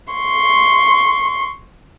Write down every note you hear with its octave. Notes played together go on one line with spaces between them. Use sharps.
C6 C#6